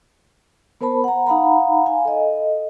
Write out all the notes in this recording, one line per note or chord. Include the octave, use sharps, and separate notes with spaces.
B3 A#4 C5 A5 B5
F#5 A#5
D#4 F5 F#5 A#5 B5
F5 G#5
A4 D#5